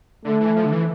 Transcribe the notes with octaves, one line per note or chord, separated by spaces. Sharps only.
D3 A3
E3
F3
D3
E3